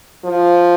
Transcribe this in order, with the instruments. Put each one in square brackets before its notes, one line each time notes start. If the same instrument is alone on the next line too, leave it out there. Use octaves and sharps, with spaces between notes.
[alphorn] F3